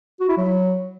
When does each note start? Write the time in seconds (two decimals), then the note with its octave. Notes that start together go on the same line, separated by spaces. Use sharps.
0.20 F#4
0.29 E4
0.37 F#3